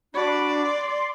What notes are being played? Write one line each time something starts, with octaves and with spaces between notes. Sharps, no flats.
D4 F#4 D5 B5
C6